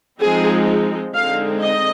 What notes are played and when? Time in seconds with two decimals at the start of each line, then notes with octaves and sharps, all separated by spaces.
0.21 F3 G#3 C4 D#4 G#4
1.14 D3 G#3 C4 D#4 F5
1.61 D#5